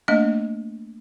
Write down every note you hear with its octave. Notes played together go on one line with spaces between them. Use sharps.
A3 A#3 D4 D#5